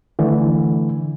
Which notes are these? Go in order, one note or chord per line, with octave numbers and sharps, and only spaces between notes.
D3 E3 A3